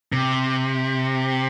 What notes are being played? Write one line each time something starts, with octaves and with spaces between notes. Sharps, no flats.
C3